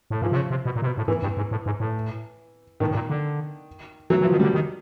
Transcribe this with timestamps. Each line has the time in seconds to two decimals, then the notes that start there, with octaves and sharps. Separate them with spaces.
0.10 A2
0.22 G#2 F3
0.32 C3
0.36 C#3
0.50 C3
0.65 B2
0.76 A#2
0.82 C3
0.87 B2
0.97 A2
1.08 G#2 E3
1.22 G2
1.37 G#2
1.51 A2
1.66 G#2
1.80 A2
2.80 A2 D#3
2.91 A2
2.95 A#2
3.10 D3
4.10 E3 F#3
4.21 E3
4.24 F3
4.32 D#3
4.40 D3 G3
4.54 D#3